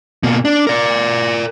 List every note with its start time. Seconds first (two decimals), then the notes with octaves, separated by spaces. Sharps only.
0.23 B2 A#3
0.45 D4
0.67 A#4 D5